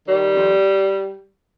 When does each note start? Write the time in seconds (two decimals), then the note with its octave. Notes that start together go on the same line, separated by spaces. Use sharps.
0.08 D#3 G3
0.32 F2